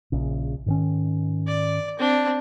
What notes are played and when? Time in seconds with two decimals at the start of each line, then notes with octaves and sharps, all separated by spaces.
0.12 A#1 C#3
0.66 G#2 D#3 C#4
1.47 D5
1.98 C4 D4